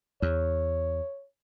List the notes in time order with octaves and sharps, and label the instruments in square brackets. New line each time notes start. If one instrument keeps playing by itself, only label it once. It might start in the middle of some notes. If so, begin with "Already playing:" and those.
[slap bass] E2 [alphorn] C#5